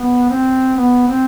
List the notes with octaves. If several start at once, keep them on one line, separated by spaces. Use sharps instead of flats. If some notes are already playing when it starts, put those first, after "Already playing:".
Already playing: B3
C4
B3
C4